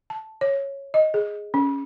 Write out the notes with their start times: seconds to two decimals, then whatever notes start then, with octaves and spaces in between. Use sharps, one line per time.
0.10 A5
0.41 C#5
0.94 D#5
1.14 G#4
1.54 C#4